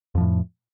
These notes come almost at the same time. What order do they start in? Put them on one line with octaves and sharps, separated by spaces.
F2 F3 A2